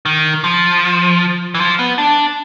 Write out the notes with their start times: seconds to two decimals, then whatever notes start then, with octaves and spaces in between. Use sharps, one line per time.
0.06 D#3
0.44 F3
1.55 E3
1.60 F3
1.79 B3
1.98 D4